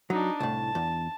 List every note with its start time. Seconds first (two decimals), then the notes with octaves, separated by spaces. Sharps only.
0.10 F#3 D4 D#4
0.40 C2 A2 A5
0.75 E2